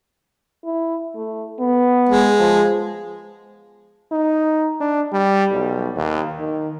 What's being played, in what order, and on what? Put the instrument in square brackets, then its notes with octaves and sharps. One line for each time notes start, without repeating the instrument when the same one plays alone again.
[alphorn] E4
A3
B3
[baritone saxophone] G#3
[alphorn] F3
[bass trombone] D#4
D4
G3
B1
D#2
D#3